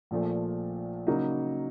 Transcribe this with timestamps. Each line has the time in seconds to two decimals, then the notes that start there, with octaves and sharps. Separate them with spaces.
0.11 A#1 A#2 F3 A3
1.07 C#3 F#3 A#3 D#4